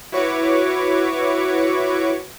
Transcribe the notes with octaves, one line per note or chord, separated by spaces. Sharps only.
E4 F#4 B4 C#5 C#6 D6